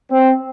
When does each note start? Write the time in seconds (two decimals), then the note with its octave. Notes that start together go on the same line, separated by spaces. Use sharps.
0.11 C4